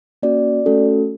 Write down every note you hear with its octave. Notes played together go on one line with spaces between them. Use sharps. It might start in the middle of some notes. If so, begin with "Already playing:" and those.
A#3 C#4 F#4 D5
A3 C#4 F#4 A4